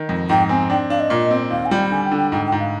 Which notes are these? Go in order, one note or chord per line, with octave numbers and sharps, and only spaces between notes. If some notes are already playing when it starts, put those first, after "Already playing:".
Already playing: D#3
F2
G#2 G5
C4 G#5
D4 G5
D4 F5
D#5
A#2
C4
D#2 F5
G#5
G3 G5
D3 G#5
G5
D3
G5
G#2 G5
G5
G#2
F5